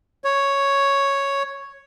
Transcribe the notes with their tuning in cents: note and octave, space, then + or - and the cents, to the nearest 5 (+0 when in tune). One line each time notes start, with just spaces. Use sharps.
C#5 +0